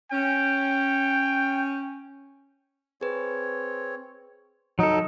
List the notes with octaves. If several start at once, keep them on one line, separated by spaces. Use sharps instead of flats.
C#4 G5
C4 G#4 B4 C#5
F#3 D#4 A4